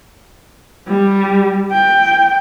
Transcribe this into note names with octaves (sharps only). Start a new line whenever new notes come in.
G3
G5